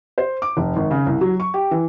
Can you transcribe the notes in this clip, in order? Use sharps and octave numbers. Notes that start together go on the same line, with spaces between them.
C5
D6
F1
G#1
C#3
C2
F#3
C#6
G4
E3